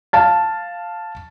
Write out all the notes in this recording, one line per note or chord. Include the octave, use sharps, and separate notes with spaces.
F5 A5 A6